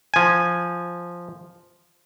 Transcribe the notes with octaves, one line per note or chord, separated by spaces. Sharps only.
F3 G#5